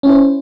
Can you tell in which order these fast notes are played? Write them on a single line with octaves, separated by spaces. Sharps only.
C#4 E4 C5